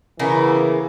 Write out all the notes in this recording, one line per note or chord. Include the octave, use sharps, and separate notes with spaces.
C#3 E3 A#3 B3